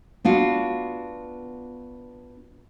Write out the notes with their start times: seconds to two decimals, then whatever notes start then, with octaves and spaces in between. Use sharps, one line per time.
0.25 B3 D4 F4 F#4